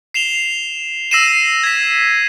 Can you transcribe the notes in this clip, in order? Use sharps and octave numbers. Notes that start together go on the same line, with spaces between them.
C7 E7 F7 G7
E6 A#6 C7 D#7 E7
G#6 B6